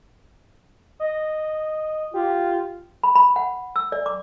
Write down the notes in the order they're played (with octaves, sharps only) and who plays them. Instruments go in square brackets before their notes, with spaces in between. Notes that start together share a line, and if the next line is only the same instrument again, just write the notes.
[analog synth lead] D#5
[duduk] F4 [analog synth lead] G4
[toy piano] B5
B5
F#5
E6
D5
D6